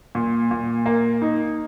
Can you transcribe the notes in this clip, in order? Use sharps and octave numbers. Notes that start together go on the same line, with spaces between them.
A#2
A#2
A#3
D#4